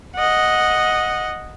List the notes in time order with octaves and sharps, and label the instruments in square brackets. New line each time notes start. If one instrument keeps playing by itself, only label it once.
[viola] D#5 F#5